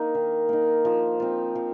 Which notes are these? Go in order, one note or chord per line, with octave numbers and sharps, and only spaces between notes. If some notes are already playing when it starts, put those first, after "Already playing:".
Already playing: A#3 D#4
D#3
A#3 D#4
F3
C4 F4
F3